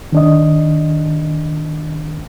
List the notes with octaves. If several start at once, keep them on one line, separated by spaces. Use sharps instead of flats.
D#3 D4 D#5